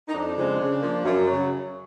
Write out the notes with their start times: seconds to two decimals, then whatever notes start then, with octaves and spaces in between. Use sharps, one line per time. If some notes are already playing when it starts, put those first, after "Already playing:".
0.08 D#4
0.14 F2 D4
0.37 C#3 F3 G#3 C4
0.60 C#3
0.82 F3 A#3
1.05 F#2
1.27 C#3 F#3